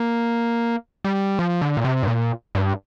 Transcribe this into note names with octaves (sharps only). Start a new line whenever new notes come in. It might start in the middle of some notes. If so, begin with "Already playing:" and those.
Already playing: A#3
G3
F3
D3
A#2
C3
G2
A#2
G2